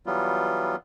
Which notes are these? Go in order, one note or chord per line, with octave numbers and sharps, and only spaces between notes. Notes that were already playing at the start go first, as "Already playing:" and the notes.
E3 F#3 G3 B3 F4